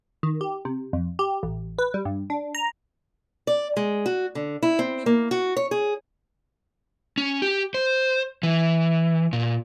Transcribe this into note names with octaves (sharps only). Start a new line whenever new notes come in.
D#3
G4
C3
F2
G4
A1
B4
G3
G2
D4
A#5
D5
G#3
F#4
D3
E4
C4
A#3
F#4
C#5
G#4
C#4
G4
C5
E3
A#2